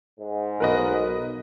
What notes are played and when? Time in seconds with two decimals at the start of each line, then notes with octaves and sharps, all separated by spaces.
0.20 G#2
0.60 B1 A#4 B4 D#5